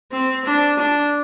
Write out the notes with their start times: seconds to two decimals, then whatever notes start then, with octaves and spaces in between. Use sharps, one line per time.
0.11 C4
0.45 D4
0.79 D4